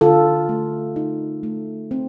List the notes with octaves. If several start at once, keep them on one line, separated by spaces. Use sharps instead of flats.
D3 F4 A4
A3
D#4
A3
C4